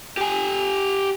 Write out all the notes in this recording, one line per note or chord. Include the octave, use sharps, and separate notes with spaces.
G4 G#5